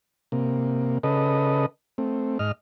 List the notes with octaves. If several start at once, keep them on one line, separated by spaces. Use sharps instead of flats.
C3 A#3
C#3 A4 B4 D#5
A3 C4
G#2 D#5 F6